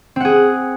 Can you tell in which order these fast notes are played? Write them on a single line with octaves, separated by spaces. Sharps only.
C4 F#5 G#4